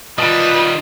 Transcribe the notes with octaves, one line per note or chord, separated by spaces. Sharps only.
D#3 G3 F4 B4 D#5 A5